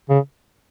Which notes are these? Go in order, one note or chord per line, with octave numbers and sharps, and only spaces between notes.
C#3